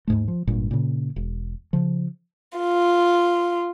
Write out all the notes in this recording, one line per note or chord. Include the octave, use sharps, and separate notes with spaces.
D#2 G#2 A3
F3
G#1 G2 A#2
A#2 C#3
E1
C#3 F3
F4